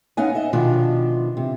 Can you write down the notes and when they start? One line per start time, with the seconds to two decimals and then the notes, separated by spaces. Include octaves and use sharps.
0.17 B3 C#4 D#4 F5 F#5 G#5
0.35 D#5 E5
0.53 B2 D#3 F3 D4 F4
1.37 C3